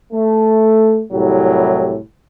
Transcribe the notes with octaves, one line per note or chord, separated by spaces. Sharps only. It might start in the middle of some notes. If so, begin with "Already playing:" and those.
A3
C2 A2 F#3 G4